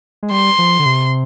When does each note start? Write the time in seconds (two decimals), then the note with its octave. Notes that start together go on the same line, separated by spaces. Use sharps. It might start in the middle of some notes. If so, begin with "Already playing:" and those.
0.23 G#3
0.31 G3 C6
0.59 F3
0.79 D3
0.86 C3